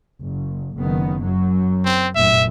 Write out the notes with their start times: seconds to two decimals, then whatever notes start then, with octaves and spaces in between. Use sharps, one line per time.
0.21 F#1
0.77 F#1 D#3 B3
1.21 F#2 F#3
1.85 C4
2.15 F1 F#2 A#2 E5